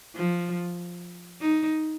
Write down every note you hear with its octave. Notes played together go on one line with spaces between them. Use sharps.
F3
D#4